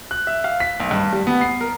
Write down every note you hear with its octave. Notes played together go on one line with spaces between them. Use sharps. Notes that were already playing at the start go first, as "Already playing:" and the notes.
F#6
E5
F5
B6
B1
G2
G3
B3
C7
A#4